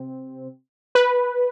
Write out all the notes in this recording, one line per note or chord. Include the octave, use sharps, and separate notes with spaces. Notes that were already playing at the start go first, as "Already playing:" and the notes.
Already playing: C3 C4
B4